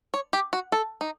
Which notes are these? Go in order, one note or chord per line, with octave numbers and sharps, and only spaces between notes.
C#5
G4
F#4
A4
D#4